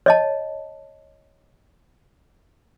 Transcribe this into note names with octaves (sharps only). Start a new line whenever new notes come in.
C#5 D#5 A5